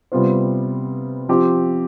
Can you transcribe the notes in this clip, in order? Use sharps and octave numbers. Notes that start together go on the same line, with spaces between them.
C3 G3 B3 F4 C5
F3 C4 G4 C5